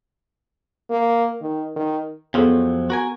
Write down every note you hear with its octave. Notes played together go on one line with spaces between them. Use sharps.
A#3
D#3
D#3
F2 F3 F#3 B3 G#4 A4
F#4 A#4 G#5